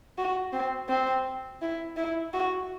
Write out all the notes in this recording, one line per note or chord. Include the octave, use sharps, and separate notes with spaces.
F#4
C4
C4
E4
E4
F#4